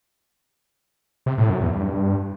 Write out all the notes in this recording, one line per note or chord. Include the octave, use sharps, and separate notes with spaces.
C3
A2
F#2
E2
G2